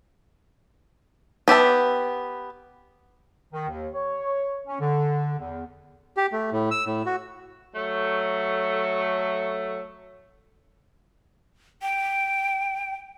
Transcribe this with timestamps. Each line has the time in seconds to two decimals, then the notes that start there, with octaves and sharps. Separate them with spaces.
1.48 B3 G4 E5 A5
3.53 D#3
3.68 D#2
3.94 C#5
4.67 C#4
4.80 D3
5.38 E2
6.17 G4
6.32 A3
6.52 A2
6.71 E6
6.86 A2
7.06 F#4
7.75 F#3 A3
11.82 G5